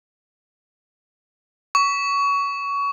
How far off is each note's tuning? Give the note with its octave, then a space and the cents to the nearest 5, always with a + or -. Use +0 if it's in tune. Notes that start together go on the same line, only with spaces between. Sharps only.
C#6 +25